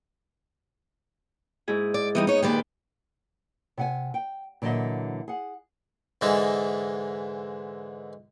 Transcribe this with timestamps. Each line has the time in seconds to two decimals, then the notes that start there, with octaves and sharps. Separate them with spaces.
1.68 G#2 E4 G#4
1.94 D5
2.15 E3 G3 B3 D#4 D#6
2.27 D#4 C#5
2.42 A#2 D#3 G4 B4 D5
3.77 C3 F#5 G#5
4.14 G5
4.62 A#2 D3 E3 F#3 D#5 E5
5.28 G#4 F#5
6.21 G#2 D3 E3 G#3